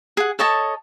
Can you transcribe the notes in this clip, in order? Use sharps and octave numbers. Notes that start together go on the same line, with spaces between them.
G#4 F#5
A4 C#5 D#5 A5